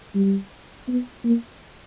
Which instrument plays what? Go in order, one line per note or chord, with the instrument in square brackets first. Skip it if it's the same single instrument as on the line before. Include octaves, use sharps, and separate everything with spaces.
[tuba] G3
B3
A#3